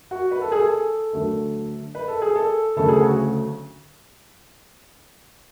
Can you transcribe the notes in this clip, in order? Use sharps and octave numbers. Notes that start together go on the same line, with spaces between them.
F#4
B4
A4
G#4
A4
D2 D3 F#3 A3
B4
A4
G#4
A4
D2 C#3 F#3 A3 A4
G#4
F#4